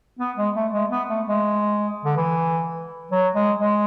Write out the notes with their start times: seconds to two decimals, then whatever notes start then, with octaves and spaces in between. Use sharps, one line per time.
0.19 B3
0.37 G#3
0.55 A3
0.73 G#3
0.90 B3
1.08 A3
1.27 G#3
2.05 D3
2.16 E3
3.11 F#3
3.35 G#3
3.59 G#3